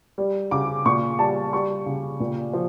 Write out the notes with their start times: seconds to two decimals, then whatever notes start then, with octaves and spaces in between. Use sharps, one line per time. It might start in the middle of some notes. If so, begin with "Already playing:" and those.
0.18 G3
0.51 C#3 D6
0.86 A#2 C#6
1.19 G3 A5
1.53 G3 C#6
1.86 C#3
2.20 A#2
2.53 F3